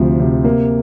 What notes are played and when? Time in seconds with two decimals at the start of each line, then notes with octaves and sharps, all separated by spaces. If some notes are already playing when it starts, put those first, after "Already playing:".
Already playing: D2 C3 F3
0.19 C3
0.44 A#3